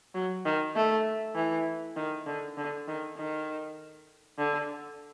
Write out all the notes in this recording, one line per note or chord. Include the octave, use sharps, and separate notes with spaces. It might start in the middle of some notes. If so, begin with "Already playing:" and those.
F#3
D#3
A3
E3
D#3
D3
D3
D#3
D#3
D3